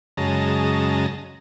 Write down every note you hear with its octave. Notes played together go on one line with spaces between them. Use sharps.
F#2 C#3 G#3 D#5 A5 A#5